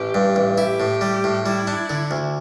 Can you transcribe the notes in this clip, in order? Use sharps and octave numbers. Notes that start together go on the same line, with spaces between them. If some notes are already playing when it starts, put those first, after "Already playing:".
Already playing: A1 G4
G2
A1
E4 G4
A2
G3
A2
G3 E4
D4
D3
D2